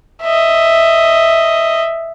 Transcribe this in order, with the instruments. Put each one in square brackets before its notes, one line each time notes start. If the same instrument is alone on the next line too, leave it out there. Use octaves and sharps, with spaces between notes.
[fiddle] D#5 E5